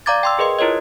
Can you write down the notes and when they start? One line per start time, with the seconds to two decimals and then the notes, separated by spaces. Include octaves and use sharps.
0.06 D5 F5 A#5 D6 G#6 A6
0.23 G5 C6 E6
0.39 G#4 A#4 B4 D#5 C6
0.59 E4 F4 A#4 C#5 D#5